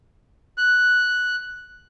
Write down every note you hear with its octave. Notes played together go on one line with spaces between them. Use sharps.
F#6